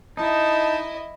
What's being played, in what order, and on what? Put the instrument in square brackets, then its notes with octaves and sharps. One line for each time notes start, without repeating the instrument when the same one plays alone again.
[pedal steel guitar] D#4 [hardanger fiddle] E4 D#5 [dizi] A5